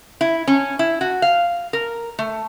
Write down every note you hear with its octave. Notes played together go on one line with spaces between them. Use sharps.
E4
C#4
E4
F#4
F5
A#4
A3